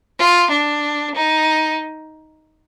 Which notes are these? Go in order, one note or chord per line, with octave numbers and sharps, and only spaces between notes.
F4
D4
D#4